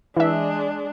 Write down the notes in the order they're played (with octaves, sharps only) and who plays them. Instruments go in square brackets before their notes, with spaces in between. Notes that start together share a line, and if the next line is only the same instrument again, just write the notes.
[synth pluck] E3 E5 [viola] G#3 D4